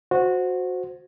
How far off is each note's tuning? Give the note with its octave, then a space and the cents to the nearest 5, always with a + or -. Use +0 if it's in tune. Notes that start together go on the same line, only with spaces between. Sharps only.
F#4 -15 C5 +0